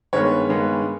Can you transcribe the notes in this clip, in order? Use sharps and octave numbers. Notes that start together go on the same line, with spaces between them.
G2 D#3 G#3 B3 C#5
G2 D#3 G#3 B3